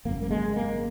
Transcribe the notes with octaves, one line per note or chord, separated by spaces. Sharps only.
G#1 F#2 C#3 A#3
A#3
G#3
A#3